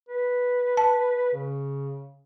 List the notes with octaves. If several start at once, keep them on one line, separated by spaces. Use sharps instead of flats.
B4
A5
C#3